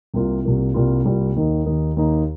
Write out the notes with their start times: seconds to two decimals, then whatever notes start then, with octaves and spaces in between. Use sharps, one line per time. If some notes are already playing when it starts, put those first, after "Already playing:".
0.14 C2 C3 G3 A#3 F4
0.44 C2 C3 G3 A#3 F4
0.74 C2 C3 G3 A#3 F4
1.05 C2 C3 G3 A#3 F4
1.36 D#2 D#3 A#3 D#4
1.66 D#2 D#3 A#3 D#4
1.97 D#2 D#3 A#3 D#4